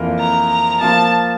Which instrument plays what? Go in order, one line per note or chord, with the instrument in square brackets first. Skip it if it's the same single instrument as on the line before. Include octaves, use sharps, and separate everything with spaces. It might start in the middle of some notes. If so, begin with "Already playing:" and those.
Already playing: [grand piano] F2 E3 A#3 F4 A#4
[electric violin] A#5
A#5
[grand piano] F3 A#3 F4 [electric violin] A5